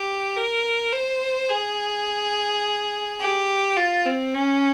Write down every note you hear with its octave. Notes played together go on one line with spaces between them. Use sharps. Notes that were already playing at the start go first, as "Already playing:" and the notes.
Already playing: G4
A#4
C5
G#4
G4
F4
C4
C#4